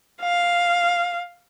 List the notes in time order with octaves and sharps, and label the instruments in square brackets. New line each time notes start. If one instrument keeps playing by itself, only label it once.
[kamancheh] F5